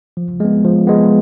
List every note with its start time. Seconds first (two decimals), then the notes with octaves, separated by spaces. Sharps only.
0.17 F3
0.40 G#3 B3
0.64 F3
0.87 G#3 B3